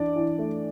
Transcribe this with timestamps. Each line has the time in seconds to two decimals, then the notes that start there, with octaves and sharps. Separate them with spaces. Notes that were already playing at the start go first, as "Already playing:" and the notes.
Already playing: E3 D4 D5
0.16 E3
0.39 A3